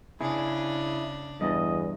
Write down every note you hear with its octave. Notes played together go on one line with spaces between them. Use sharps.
C#3 D4 E4 G#4
E2 G2 D#5